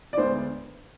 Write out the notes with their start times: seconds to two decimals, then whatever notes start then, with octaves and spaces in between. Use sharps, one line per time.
0.13 D5
0.17 D2 D3 G#3 B3 C5